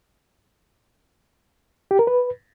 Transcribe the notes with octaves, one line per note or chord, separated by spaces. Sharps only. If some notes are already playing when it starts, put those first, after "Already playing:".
G4
A#4
B4